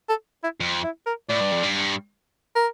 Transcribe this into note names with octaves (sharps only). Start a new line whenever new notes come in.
A4
E4
F2
E4
A#4
A2 D5
G2
F2
G2
A#4